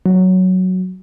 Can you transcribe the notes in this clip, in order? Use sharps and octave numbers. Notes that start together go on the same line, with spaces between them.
F#3